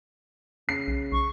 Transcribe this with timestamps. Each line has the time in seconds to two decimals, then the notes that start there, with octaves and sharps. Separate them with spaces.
0.69 C#3 C7
0.88 B1
1.12 B1 C#6